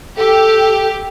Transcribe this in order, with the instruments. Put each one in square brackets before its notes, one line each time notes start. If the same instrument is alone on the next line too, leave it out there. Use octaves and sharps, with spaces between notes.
[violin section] G4 [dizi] A4